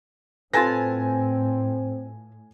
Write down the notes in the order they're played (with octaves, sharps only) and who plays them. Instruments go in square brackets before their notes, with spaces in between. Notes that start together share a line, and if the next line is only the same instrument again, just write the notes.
[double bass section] A2 [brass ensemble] C4 [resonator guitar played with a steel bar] F4 A4 B4 [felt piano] G#5 A#6